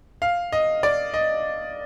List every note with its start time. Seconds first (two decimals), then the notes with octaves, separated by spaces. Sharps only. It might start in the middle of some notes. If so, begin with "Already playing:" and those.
0.22 F5
0.52 D#5
0.83 D5
1.14 D#5